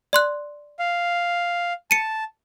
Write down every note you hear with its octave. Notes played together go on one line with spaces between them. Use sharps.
D5 C6 F#6
F5
A5 C#7 D#7